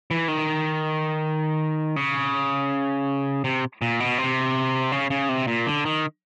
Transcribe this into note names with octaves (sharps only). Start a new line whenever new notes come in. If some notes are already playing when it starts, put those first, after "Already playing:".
E3
D#3
C#3
C3
A#2
B2
C3
C#3
C#3
C3
A#2
D3
D#3